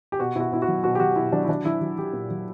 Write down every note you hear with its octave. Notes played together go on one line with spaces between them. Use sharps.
G4
B2 F#4
B2 E4 F#4
B2 E4
F#4
F#3
B2 F#4
G4
F#3 F#4
B2 E4
F#3 D4
E4
F#3 D4
F#3 E4
F#3
F#3 G4
A#2
F#3